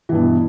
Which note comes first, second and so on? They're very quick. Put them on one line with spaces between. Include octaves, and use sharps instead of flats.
E3 G2 B2